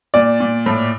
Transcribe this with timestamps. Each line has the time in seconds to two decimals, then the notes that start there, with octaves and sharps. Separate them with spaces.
0.14 A#2 D5
0.40 A#2
0.66 A2